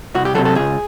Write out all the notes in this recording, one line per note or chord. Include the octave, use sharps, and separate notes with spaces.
C2 F#4
G4
C3 D#3 F#3 A4
A4
C#2 G#4